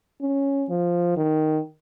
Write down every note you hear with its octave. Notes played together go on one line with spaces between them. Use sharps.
C#4
F3
D#3